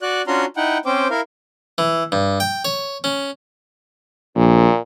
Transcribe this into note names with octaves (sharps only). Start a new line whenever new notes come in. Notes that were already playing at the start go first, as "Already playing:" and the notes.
F#4 D5 F#6
C#4 D4 F4 F#4 A#5 C6
D#4 E4 F#5 G5
C4 C#4 C5 G5 D6
E4 A#4 F5
E3
G2
G5
C#5
C#4
A#1 A#2